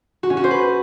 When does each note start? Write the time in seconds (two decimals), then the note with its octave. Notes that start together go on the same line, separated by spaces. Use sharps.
0.23 F#4
0.30 C#4
0.37 F#4
0.44 C5
0.51 B4